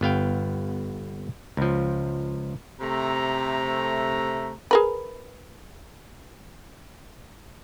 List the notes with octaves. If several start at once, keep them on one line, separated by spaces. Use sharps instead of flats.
G1 B3 F5 G5
C#2 F3
C3 A3 A#5
G#4 A#4 B4